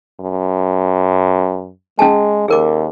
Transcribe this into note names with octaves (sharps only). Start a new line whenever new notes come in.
F#2
G#3 C#4 G#4 A5
D#2 G#4 A#4 D6